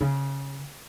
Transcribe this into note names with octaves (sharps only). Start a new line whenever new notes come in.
C#3